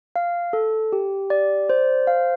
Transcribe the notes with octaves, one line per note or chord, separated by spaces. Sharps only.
F5
A4
G4
D5
C5
F5